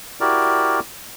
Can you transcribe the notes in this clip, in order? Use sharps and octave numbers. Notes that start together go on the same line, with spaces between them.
E4 F#4 G4 A#4 D5